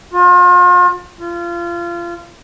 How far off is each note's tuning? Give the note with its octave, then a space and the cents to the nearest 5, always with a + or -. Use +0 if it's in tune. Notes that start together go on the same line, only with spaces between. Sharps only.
F4 +40
F4 -25